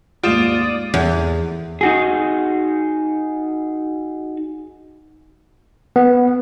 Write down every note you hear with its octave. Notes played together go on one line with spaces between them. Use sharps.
D#2 G#2 F4 D5 D#6 D7 E7
E2
D#4 F#4 G#4
B3